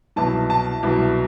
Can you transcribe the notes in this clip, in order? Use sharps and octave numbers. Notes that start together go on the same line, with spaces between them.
C2 B2 F#3 A5
A5
C2 B2 F#3